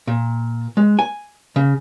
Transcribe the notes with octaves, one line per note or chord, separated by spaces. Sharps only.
A#2
G#3
G#5
C#3